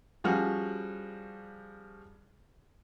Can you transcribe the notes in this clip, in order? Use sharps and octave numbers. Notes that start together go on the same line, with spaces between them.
F3 G3 C#4 F#4 G#4